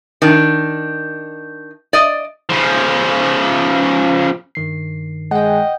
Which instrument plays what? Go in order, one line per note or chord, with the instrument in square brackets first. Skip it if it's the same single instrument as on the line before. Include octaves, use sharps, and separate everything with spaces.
[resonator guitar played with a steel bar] D#3 D4
D5 D#5
[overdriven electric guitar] C#3 F3
[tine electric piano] G2 D#3 C7
[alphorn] G#3 [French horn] D#5 [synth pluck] F#5 G5